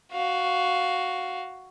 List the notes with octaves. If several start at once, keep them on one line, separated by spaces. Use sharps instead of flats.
F#4 F5